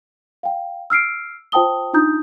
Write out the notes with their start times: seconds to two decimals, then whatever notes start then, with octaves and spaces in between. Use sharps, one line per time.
0.43 F5 G5
0.90 E6 F6 C7 D7
1.52 F4 C5 G5 A5 D#6 G7
1.93 D4 D#4 F4 A#5 D#6 G6